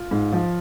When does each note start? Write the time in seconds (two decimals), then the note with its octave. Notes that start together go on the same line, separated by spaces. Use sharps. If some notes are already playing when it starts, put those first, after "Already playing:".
Already playing: F4
0.11 G#2
0.32 F3